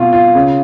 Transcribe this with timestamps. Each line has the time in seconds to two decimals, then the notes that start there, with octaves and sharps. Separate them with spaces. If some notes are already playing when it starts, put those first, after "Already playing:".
Already playing: B2 F4
0.13 F4
0.35 C#3